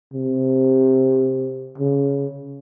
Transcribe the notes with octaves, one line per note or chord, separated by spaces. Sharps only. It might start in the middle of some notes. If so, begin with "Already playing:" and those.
C3
C#3